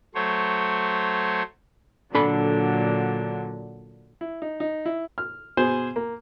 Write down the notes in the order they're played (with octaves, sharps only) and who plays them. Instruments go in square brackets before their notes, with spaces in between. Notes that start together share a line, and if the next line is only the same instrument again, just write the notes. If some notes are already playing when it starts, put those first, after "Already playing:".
[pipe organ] F#3 A3 C5 C#5
[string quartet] A#2 D3 F#3 [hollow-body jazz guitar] D4 A4 B5
[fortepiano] E4
D#4
D#4
E4
F6
B2 G#4 C5 G#5
A#3